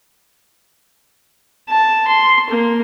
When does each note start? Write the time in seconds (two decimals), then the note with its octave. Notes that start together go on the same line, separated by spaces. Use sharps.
1.69 A5
2.08 C6
2.50 A#3